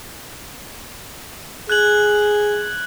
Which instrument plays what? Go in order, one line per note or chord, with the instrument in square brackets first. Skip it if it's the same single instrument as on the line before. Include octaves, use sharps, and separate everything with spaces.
[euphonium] G#4 [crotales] F#6 G#6 F#7